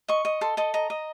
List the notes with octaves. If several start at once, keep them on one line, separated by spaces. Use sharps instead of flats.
D#5 C#6
D#5
A4 C6
A4 D#5
D#5 A#5
D#5